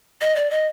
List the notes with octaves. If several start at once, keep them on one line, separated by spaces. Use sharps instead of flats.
D#5
D5
D#5